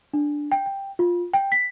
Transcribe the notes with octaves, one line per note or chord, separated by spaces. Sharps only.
D4
G5
G5
F4
G5
B6